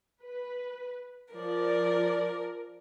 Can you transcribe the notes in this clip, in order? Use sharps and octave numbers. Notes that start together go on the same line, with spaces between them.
B4
F3 A#4 D5